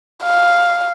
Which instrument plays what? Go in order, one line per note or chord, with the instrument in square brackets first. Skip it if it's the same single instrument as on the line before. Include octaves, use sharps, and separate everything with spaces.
[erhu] F5